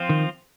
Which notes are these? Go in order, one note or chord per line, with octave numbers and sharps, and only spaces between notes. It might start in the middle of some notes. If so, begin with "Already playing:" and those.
Already playing: F3 C4 F4 C5
D#3